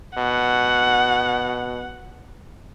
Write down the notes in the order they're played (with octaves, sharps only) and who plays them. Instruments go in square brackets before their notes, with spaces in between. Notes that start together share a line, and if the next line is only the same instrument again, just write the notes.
[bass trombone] B2 [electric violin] F#5